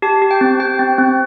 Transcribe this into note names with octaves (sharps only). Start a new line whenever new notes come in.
G4 A5
G4
G5
C4
G4 G5
C4
C4